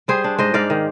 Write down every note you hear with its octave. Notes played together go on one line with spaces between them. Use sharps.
G3 G#4 C5
D4
G#2 C5 D#5
G#2 D5 F5
D#3